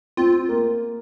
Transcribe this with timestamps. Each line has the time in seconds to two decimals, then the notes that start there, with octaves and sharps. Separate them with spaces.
0.17 C4 F4
0.49 A#3